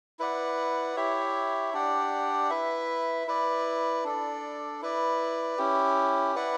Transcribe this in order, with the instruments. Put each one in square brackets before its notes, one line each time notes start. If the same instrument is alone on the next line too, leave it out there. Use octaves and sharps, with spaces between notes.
[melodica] E4 B4 D5 F#5
E4 G4 C#5 E5
D4 G4 D5 F#5
E4 B4 E5
E4 B4 D5
D4 A4 D5
E4 B4 D5
C#4 E4 G4
E4 B4 D5 F#5